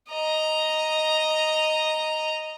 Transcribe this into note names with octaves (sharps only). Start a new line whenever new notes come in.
D#5 A#5